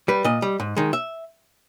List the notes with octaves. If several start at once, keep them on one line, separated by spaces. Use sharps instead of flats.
G3 B4
A#2 D#5
G3
G#2
D#3 G#3
E5